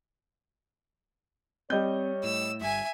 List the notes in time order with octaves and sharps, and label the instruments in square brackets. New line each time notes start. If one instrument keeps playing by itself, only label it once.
[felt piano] G3 D#5 G6 [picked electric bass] C4 [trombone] C#5
[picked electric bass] A2 [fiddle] E6
[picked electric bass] G1 G2 [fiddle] E5 G#5